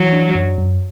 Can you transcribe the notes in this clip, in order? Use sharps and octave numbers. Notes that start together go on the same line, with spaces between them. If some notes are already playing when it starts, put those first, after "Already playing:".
Already playing: E3 F#3
D4
F#2
F#2